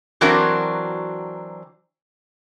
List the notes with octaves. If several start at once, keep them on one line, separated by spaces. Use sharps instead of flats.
E3 F#3 C4 D4 F#4 A#4